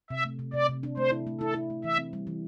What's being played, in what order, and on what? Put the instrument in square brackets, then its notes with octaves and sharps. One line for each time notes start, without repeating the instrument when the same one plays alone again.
[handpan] C3 [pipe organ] E5
[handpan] A3
C3
[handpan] C3 [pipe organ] D5
[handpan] C3
D4
[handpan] A3 [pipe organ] C5
[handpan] E4
A3
[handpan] E4 [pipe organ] A4
[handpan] E4
A3
[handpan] E3 [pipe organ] E5
[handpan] C4
G3
E3